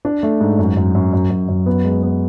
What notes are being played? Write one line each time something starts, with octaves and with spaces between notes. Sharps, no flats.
D4
A3
G#2
F#2
F#2
F#2
F#2
F#2
F#2
B3
G#3
B3